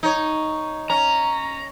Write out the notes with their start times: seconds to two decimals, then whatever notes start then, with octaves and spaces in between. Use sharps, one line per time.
0.03 D#4 C#5
0.90 C#4 A#5